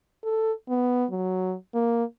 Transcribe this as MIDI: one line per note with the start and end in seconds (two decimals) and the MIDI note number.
0.24 0.52 69
0.69 1.05 59
1.11 1.54 54
1.75 2.04 58